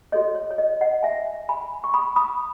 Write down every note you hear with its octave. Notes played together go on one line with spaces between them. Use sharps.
F#4 A4 C#5 D#5
C#5
C#5
D#5
D#5 F#5
E5 G#5
G#5 B5
C#6
B5 D#6
B5 D#6